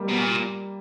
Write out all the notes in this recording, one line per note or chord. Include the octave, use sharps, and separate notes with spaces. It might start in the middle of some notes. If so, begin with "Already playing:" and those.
Already playing: G3 A#3
B2
A#2